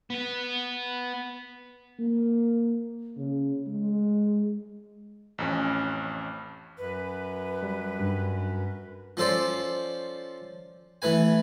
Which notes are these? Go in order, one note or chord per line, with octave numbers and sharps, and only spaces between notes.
B3 B4
A#3
C#3
G#3
A1 F2 C#4
F#2 B4
G3
G2
F3 C#4 A4 C5 D5
E3 A3 B4 G#5